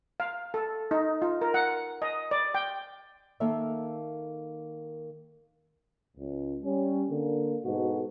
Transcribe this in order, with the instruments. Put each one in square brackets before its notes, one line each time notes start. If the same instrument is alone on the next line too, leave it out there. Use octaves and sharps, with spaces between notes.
[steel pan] F5
A4
D#4
F4
A#4
F#5
D#5
D5
G5
[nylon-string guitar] D#3 A#3 A4 A#4 E5 F5
[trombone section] C#2
G3 C#4
D3 A#3
G#2 B2 F#4 A4